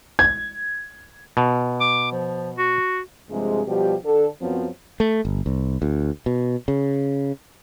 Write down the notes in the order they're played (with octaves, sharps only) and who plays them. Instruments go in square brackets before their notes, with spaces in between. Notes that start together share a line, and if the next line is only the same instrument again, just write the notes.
[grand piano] G#6
[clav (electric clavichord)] B2
[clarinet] D6
F3
F#4
[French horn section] G2 C3 F3 G#3
B2 F3 G3 G4
D3 A4
F#2 F3 F#3 B3 C4
[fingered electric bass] A3
G1
C2
D2
B2
C#3